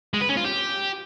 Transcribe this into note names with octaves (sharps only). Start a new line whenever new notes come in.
G#3
B4
C#4
F4
G4